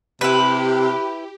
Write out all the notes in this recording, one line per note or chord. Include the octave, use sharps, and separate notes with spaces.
C3 E4 G4 B4